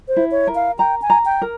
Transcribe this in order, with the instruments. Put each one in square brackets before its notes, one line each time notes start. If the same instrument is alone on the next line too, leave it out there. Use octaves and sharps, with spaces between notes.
[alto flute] C5
[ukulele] E4
[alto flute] C#5
[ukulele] A#4
[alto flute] F5
[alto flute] G5 [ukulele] A#5
[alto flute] G#5
[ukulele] A#5
[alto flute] G5
[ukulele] A#4